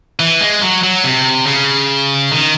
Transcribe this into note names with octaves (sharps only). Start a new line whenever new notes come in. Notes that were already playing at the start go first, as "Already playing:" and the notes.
E3
G#3
F#3
F#3
C3
C#3
D#3